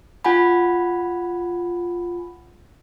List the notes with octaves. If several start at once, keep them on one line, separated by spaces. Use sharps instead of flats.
F4 F#5 G#5 B5